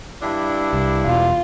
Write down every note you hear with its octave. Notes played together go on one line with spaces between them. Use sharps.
G2 D4 E4
C2
E1 B2 F4